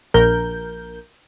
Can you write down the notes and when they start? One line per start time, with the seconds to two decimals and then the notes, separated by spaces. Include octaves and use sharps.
0.14 A#1 A#4 G6